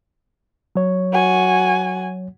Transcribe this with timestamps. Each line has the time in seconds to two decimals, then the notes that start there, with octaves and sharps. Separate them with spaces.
0.76 F#3 C#5
1.13 F#4 G#5